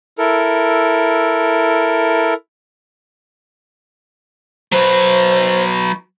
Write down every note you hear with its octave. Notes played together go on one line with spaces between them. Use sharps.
E4 A4 A#4
F#3 B4 C5